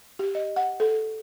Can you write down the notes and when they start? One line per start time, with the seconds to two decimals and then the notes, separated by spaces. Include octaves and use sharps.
0.19 G4
0.35 D#5
0.56 F#5
0.80 A4